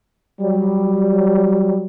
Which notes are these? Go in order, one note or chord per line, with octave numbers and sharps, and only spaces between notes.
F#3 G3